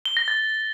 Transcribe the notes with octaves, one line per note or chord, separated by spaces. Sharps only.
G7
A#6
A6